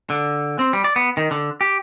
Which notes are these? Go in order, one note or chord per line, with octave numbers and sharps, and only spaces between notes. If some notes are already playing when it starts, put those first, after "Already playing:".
D3
C4
G3
D5
B3
D#3
D3
G4